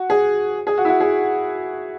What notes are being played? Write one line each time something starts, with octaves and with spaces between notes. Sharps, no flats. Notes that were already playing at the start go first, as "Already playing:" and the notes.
Already playing: F#4
G#4
G#4
F#4
E4
F#4
G#4